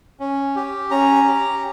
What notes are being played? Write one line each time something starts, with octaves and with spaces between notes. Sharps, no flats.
C#4
G4
C#4 A#5
G4